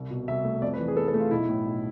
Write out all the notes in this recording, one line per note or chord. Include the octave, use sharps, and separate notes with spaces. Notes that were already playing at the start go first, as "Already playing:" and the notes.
Already playing: C2
B2
C2 E5
A3
F2 D5
B4
E3
G#4
F2 A4
A4
A3
F4
B1 E4
A2
B1